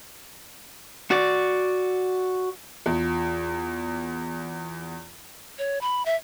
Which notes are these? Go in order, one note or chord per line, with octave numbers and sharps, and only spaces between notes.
F#4 D5
E2 F4
C#5
B5
E5